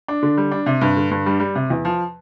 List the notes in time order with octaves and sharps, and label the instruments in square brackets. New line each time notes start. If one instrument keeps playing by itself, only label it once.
[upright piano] D4
D3
G3
D4
C3
G2
D3
G2
G3
G3
C3
E2
F3